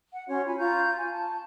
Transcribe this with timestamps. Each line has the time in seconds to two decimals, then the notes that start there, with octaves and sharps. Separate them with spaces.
0.13 F#5
0.28 C#4 F#4 C#5 C6
0.45 F4 G#5 B5
0.58 F4 A#5 C#6 G6
0.97 G#5
1.12 A5